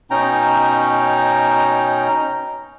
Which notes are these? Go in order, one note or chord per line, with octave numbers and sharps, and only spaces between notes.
B2 C#4 D#4 G5 A#5